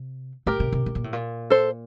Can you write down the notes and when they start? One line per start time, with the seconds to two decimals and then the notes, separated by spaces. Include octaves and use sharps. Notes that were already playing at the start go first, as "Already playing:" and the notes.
Already playing: C3
0.46 A2 G4 A#4
0.60 C3
0.72 C3
0.86 C3
0.95 A#2
1.04 A2
1.13 A#2
1.50 A4 C5